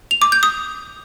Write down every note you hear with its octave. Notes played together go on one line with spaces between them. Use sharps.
F7
D6
G6
D#6